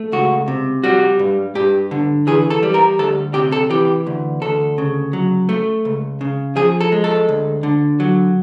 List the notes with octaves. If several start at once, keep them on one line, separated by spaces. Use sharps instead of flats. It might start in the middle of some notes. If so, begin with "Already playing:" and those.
Already playing: A3
C#2 F#4
C3
G3 F#4
G2
G2 G4
D3
E3 G#4
A4
G3
A#4
D2 A4
C3 G4
A4
E3 G4
D2
D2 A4
C#3
F#3
A3
C#2
C#3
F3 G#4
A4
G#3
A4
D2
D3
F#3